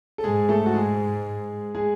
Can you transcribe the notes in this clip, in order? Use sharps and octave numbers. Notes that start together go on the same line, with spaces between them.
A4
G#2 G#3 G#4
A3 A4
F#4
G#3 G#4
G#3 G#4